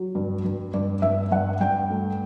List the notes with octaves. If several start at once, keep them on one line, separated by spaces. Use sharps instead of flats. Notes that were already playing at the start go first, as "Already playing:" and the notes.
Already playing: F#3
G2
G2
G2 D5
G2 E5
G2 F#5
G2 G5
A3